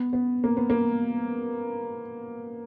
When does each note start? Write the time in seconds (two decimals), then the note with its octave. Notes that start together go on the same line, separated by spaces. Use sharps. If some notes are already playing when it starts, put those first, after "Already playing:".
Already playing: B3
0.13 B3
0.44 A#3
0.57 B3
0.70 A#3